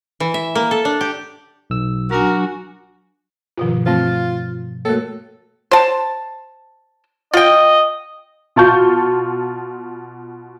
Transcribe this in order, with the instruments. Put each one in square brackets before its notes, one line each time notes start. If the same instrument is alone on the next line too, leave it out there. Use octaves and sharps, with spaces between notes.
[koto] E3
E5
A#3
A4
D4
G4
[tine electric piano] B1 E6
[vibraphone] F#3 D4 G#5 [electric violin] F#4 [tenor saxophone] A#4
[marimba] G2 B2 F3 [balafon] D#3 F4
[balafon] E3 A3 C4 [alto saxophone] F4
[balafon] A3 A#3 [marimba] F#4 A#4 C#5 [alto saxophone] A4
[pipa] C5 A5
[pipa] F4 G5 [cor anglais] D#5
[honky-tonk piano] B2 F4 A5 C#6 G6